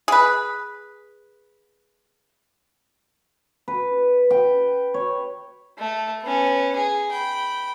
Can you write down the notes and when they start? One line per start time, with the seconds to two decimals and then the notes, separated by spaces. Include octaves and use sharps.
0.08 G#4 B4
3.68 B4
4.30 G5
4.94 C#5
5.78 A3
6.23 B3 C#4
6.76 G#4
7.11 G5 B5